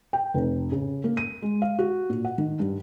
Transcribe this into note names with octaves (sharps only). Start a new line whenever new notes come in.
G5
F1
C#3
A#3
D#7
G#3
F5
F#4
A#2
F#5
D#3
G2